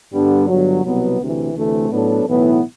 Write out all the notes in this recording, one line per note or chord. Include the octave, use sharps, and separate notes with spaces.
G2 D3 G3 B3 D4
G1 G2 F#3
C2 B2 F#3 B3
D2 C3 E3
D2 C3 E3 A3
A2 F#3 B3 D4 A4
B1 A2 E3 B3 E4